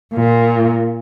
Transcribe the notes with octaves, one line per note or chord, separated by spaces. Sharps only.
A#2